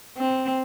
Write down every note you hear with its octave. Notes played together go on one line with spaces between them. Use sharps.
C4